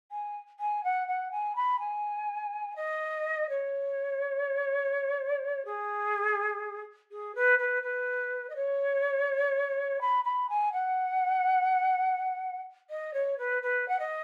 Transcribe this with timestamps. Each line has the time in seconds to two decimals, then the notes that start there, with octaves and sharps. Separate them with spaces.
0.11 G#5
0.59 G#5
0.83 F#5
1.07 F#5
1.31 G#5
1.55 B5
1.79 G#5
2.75 D#5
3.49 C#5
5.65 G#4
7.11 G#4
7.34 B4
7.58 B4
7.82 B4
8.49 D#5
8.55 C#5
10.01 B5
10.24 B5
10.49 G#5
10.72 F#5
12.90 D#5
13.13 C#5
13.37 B4
13.62 B4
13.88 F#5
13.99 D#5